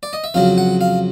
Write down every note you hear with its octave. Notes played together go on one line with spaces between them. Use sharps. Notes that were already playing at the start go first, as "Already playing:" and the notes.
D5
D#5
E5
F2 C#3 F#3 F5
F#5
F5